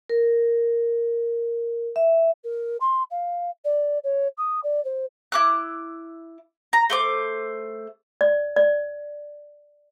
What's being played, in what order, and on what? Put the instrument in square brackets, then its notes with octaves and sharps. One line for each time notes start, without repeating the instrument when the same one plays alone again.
[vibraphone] A#4
E5
[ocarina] A#4
C6
F5
D5
C#5
D#6
D5
C5
[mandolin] E4 D6 F#6
A#5
A3 C5 D6
[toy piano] D5
D5